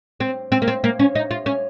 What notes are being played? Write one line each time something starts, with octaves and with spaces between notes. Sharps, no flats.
C4
C4
A#3
C4
A#3
C#4
D#4
F4
C#4